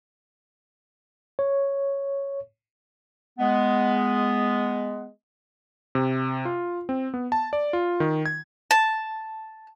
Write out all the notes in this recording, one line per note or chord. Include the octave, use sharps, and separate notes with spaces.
C#5
G#3 B3
C3
F4
C4
B3
A5
D5
F4
D#3
G#6
A5